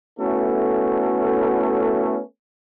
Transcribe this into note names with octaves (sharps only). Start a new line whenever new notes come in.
A3 B3 C#4 E4 F#4 A4